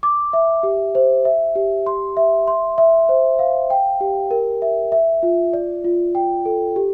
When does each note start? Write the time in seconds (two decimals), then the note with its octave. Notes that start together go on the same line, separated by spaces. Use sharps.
0.03 D6
0.33 E5
0.63 G4
0.95 C5
1.25 E5
1.55 G4
1.86 C6
2.17 E5
2.48 C6
2.78 E5
3.09 C5
3.39 F5
3.70 G5
4.01 G4
4.31 A#4
4.62 E5
4.92 E5
5.23 F4
5.53 D5
5.84 F4
6.15 G5
6.45 A4
6.76 G4